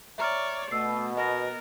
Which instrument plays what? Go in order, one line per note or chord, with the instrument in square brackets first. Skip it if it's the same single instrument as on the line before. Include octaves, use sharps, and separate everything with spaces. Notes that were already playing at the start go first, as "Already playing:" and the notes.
[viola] C#5 D5 [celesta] E5 A#5 F6
[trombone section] B2 [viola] A3 [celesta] E6 C7
[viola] B3 A#4 [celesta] D#5 A#6